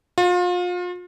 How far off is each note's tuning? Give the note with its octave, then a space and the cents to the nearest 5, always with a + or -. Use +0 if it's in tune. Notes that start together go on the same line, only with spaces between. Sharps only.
F4 +35